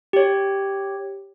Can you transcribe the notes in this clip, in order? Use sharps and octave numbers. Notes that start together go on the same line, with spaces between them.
G4 C#5